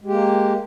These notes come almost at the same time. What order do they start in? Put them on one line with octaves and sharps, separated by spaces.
G#3 G4 A#3